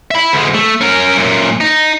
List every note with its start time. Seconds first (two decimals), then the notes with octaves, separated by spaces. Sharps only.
0.11 E5 B5
0.33 D2 G#3
0.55 A3
0.81 C#4 A#4
1.16 F#2 A#2
1.61 D#4